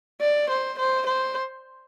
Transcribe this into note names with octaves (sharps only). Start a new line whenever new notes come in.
D5
C5
C5
C5